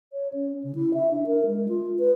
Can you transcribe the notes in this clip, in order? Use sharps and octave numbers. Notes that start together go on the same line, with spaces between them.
C#5
C#4
C#3
E4
E5
D4
A#4
G#3
F4
B4